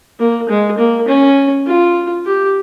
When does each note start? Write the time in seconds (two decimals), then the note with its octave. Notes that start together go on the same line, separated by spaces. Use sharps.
0.20 A#3
0.49 G#3
0.78 A#3
1.08 C#4
1.67 F4
2.26 G4